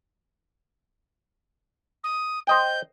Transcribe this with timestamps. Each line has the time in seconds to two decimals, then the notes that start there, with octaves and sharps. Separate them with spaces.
2.03 D#6
2.47 C5 D#5 G5 G6